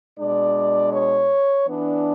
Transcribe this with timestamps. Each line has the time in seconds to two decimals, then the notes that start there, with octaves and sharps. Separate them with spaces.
0.18 B2 G#3 D4 D5
0.92 C#5
1.67 E3 B3 D4